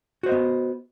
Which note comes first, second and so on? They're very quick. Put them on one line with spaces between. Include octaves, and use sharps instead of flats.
F#4 C5 D#5 B3